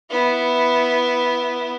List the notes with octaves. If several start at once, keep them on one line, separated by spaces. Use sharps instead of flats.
B3 E4